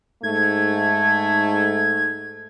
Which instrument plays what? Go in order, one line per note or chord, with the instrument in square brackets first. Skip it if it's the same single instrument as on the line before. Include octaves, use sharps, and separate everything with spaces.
[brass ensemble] G#2 A3 [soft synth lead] G#6